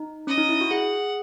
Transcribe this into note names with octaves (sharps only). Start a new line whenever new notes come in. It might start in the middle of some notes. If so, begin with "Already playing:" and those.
Already playing: D#4
C#4 D#5
D#4
E4
F#4
G#4 F#5